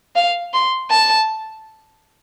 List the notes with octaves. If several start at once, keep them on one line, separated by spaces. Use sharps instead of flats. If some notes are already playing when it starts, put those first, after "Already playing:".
F5
C6
A5